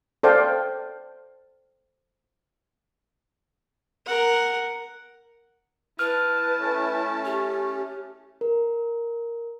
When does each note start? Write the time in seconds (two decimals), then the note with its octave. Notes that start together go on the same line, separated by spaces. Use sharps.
0.23 A4 C5 D5 F5 G5
4.06 A#4 F#5
5.99 E4 B4 A5 F6
6.58 A3 C#4
7.25 G4
8.41 A#4